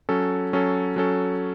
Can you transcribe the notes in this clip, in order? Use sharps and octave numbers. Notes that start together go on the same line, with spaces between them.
F#3 C#4 A4
F#3 C#4 A4
F#3 C#4 A4